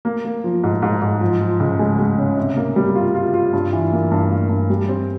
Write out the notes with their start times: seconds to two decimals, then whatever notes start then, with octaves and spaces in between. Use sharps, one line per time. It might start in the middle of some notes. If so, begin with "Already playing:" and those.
0.05 A#3
0.25 A#3
0.44 F3
0.64 G#2
0.82 G#2
1.02 G#2
1.21 F3
1.41 F3
1.60 C#2
1.79 G#3
1.99 G#3
2.18 C#3
2.37 C3
2.56 A#3
2.76 G3
2.95 F4
3.15 F4
3.34 F4
3.53 G2
3.73 E3
3.92 A#3
4.11 G2
4.30 A#3
4.49 G2
4.70 G3
4.89 C4